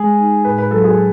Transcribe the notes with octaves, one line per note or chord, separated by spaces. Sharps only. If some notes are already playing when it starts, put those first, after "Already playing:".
Already playing: G#3 G#4
D#4
A2 B4
B4
F#3 A4
G#4